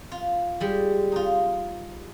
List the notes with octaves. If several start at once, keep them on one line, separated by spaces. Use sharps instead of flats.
F4
G3 G#3
D#4 F4